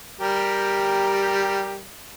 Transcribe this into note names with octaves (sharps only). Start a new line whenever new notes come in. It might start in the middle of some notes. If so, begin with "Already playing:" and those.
G3 G4 A#4